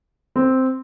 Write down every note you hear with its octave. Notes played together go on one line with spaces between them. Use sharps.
C4